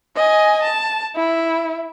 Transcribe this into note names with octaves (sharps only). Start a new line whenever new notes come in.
D#5 G#5
A5
E4